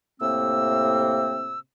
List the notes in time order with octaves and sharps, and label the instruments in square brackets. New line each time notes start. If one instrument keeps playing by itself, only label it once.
[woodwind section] A2 C3 A#3 C4 E6